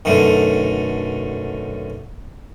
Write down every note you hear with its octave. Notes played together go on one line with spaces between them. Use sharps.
B1 F#2 D3 A3